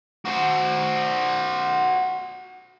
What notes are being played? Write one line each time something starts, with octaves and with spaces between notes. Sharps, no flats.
F#4 C5